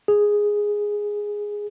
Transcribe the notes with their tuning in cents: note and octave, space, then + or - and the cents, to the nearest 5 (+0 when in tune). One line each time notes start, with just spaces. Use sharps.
G#4 -5